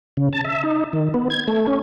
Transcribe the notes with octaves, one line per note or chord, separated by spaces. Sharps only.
C#3
A5
E5
D#4
D#3
B3
G#6
A3
C#4